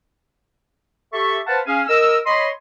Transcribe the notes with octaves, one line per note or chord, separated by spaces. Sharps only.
G4 A4 E5 C#6
B4 C5 F5 F#5 A5
C#4 G#4 F5 G#5
A#4 D#5 E6
C#5 D#5 B5 C6